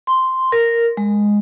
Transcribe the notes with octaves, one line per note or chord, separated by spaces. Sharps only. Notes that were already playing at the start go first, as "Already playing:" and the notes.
C6
A#4
G#3